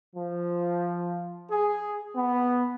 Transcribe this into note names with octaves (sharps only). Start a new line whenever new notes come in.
F3
G#4
B3